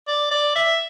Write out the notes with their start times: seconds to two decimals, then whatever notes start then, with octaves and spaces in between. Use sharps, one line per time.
0.08 D5
0.31 D5
0.55 E5